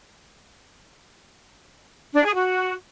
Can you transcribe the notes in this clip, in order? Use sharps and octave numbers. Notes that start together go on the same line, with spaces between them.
D4
G#4
F#4